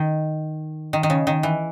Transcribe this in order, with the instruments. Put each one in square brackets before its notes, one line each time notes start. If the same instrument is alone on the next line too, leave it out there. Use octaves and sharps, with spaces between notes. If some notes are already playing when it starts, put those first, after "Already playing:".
Already playing: [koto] D#3
D#3
D#3
C#3
D#3
E3